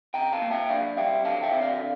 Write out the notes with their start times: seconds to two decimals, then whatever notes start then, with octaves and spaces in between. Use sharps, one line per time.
0.14 C3 G5 A#5
0.33 F5 A5
0.42 A#3
0.51 E5 G5
0.69 D4 D5 F5
0.97 G3 E5 G5
1.24 D3 F5 A5
1.43 E5 G5
1.52 C4
1.61 D5 F5
1.80 D3